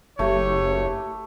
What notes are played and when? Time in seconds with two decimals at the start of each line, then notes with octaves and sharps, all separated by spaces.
0.19 F#1 A3 G4 C#5